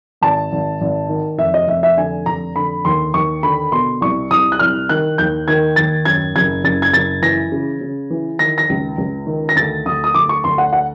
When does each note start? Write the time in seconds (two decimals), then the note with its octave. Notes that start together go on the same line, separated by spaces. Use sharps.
0.21 G#1 A5
0.52 G#1
0.81 G#1
1.09 D#3
1.38 F1 E5
1.54 D#5
1.68 F1 E5
1.83 E5
1.97 D3 G#5
2.26 F1 A#5
2.56 D3 B5
2.85 D#2 C6
3.14 D#2 C#6
3.43 D3 B5
3.72 B2 C6
4.01 C2 C#6
4.31 C2 D#6
4.52 F#6
4.59 C2 F6
4.89 D#3 F#6
5.18 D#2 G6
5.48 D#3 G#6
5.76 D#2 A6
6.05 F#2 G#6
6.36 F#1 G#6
6.64 F#1 A6
6.82 G#6
6.93 F#1 A6
7.22 E3 A#6
7.52 C#3
7.81 C#3
8.10 E3
8.39 D#3 A#6
8.58 A#6
8.69 C#2
8.98 C#2
9.27 D#3
9.49 A#6
9.56 D2 A6
9.86 D2 D#6
10.04 D#6
10.14 D2 D6
10.29 C#6
10.44 D2 C6
10.58 F#5
10.73 F#5